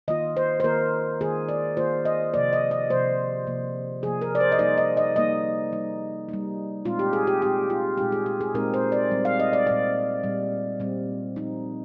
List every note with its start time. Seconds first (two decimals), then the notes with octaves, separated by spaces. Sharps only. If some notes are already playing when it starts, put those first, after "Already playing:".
0.08 D#3 A#3 F4 D#5
0.37 C5
0.60 C5
0.64 D#3 A#3 F4 A#4
1.21 D#3 A#3 F4 G#4
1.49 D5
1.77 D#3 A#3 F4 C5
2.05 D#5
2.34 C3 F3 A#3 D5
2.53 D#5
2.71 D#5
2.90 C3 F3 A#3 C5
3.47 C3 F3 A#3
4.02 C3 F3 A#3 G#4
4.22 A#4
4.35 D5
4.40 C5
4.52 D#5
4.59 G3 A#3 D#4 D5
4.78 D#5
4.97 D#5
5.16 G3 A#3 D#4 D#5
5.72 G3 A#3 D#4
6.29 G3 A#3 D#4
6.85 A#2 G#3 C4 D#4 F4
6.99 G4
7.13 G#4
7.27 G4
7.42 A#2 G#3 C4 D#4 G4
7.70 F4
7.98 A#2 G#3 C4 D#4 G4
8.12 G#4
8.26 G4
8.41 G#4
8.54 A#2 G#3 C4 D#4 A#4
8.74 C5
8.92 D5
9.11 A#2 G3 C4
9.25 F5
9.40 D#5
9.53 D5
9.67 A#2 G3 C4 D5
10.23 A#2 G3 C4
10.80 A#2 G3 C4
11.36 F3 C4 D#4